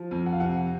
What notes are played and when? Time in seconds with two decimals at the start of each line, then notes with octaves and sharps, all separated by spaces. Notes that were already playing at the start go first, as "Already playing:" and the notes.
Already playing: F3
0.11 F2
0.26 F#5
0.33 F5
0.40 C3 F#5